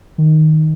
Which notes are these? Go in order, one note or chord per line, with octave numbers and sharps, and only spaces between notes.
D#3